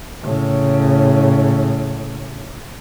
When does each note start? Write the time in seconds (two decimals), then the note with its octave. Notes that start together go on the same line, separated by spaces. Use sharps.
0.22 A2 C#3